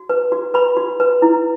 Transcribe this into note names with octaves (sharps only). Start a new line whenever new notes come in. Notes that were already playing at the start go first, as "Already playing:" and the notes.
Already playing: F#4
B4
F#4
B4 B5
F#4
B4
E4